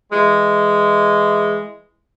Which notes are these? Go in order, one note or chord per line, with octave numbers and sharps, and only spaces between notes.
E3 G#3